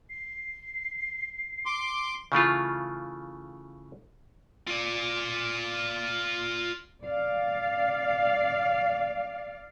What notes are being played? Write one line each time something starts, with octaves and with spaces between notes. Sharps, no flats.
C7
C6 D6
C#3 E3 A3 F4
F4 D5
D5 F5